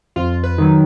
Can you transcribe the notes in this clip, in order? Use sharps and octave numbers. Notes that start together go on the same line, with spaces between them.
F2 F4
B4
D#3 F#3